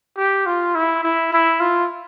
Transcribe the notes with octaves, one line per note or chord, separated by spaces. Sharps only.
G4
F4
E4
E4
E4
F4